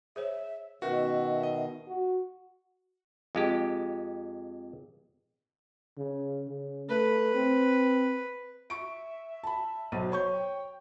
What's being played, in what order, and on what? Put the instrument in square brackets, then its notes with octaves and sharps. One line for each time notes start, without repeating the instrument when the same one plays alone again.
[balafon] G#4 C5 C#5 [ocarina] E5
[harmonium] B2 D#3 [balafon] C#4 A#4 B4 [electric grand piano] F#4 [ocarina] E5
[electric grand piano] D#5
[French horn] F#4
[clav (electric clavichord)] F2 G#3 G4
[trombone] C#3
C#3
[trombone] A3 [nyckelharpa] B4
[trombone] C4
[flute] E5 [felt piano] C#6 D7
[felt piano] A5 B5
[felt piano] B1 D#7 [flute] C5
[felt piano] C#5 C#6 G6
[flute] G5